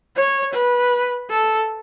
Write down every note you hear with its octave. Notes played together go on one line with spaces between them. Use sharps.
C#5
B4
A4